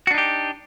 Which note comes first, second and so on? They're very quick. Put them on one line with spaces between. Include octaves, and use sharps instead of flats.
F#4 D4 D#4 G4